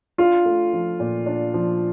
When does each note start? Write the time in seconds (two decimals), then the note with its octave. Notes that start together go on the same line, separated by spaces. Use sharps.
0.18 D4 F4
0.46 A3
0.73 F3
1.00 A#2
1.26 D4
1.54 F3